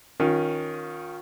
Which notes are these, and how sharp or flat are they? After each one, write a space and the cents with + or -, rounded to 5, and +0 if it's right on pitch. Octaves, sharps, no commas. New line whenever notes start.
D#3 +0 C#4 +0 F4 +35